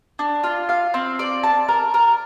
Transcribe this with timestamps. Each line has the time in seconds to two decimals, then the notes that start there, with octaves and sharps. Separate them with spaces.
0.19 D4
0.44 F4
0.69 F5
0.94 C4
1.19 D5
1.43 A5
1.68 A#4
1.94 A#4